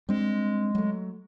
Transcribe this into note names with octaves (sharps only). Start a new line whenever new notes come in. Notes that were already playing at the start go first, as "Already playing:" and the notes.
G3 G#3 C4 D4
F#3 A3